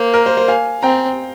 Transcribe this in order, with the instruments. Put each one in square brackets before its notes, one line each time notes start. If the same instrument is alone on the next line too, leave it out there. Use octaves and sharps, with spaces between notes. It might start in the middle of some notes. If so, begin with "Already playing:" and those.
Already playing: [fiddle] A#3 [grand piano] C5
[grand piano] A#4
C5
C5
F5 G#5
[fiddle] C4 [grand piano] G5 A#5